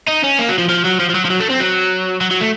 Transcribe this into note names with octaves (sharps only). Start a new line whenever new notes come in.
D#4
C#4
A#3
F#3
F3
F3
F#3
F3
F3
F#3
F3
F#3
A3
C4
F#3
F#3
F#3
A3